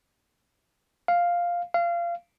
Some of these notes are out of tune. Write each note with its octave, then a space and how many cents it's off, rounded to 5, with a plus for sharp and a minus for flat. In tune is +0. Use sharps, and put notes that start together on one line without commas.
F5 +0
F5 -25